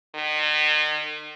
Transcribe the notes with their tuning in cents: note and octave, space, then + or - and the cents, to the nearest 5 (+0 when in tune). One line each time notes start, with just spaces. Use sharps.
D#3 -40